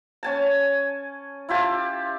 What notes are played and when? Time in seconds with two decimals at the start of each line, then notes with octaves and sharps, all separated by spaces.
0.23 C#4 G#5 A5
1.49 E4 F4 G4 A5